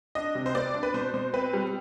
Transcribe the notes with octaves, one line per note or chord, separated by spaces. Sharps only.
D4 D#5
C3
C5
B3 D5
D4
B4
B2 C5
B2 C5
C4 B4
G3